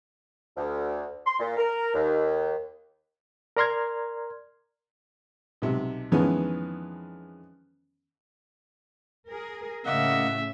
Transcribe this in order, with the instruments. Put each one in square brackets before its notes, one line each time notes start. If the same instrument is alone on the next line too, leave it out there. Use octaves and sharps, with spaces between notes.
[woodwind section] D2
C6
A#2
A#4
D#2
[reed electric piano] A#4 D5 A#5 C6 F6 G#6
[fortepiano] B1 C3
F2 D#3 E3 G#3 B3 C#4
[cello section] G#4 A#4
[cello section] A2 C#3 [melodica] A#3 D#5 F#5 [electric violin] E5